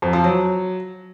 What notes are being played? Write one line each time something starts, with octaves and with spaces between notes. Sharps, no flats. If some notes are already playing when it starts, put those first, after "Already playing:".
F2
F3
F#3